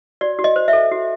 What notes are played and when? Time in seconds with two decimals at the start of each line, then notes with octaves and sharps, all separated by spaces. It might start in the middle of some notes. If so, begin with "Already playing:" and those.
0.21 F#4 D5
0.39 F#4
0.44 D#5
0.56 C5
0.68 E5
0.73 A4
0.91 F#4